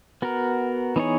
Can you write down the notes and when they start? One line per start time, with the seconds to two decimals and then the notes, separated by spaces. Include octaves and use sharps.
0.22 B3 F#4 A#4
0.96 E3 B3 D#4 G#4 C#5